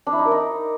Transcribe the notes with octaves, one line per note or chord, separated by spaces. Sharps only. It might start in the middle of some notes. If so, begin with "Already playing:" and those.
D4
E4
D#4
A#4
D#4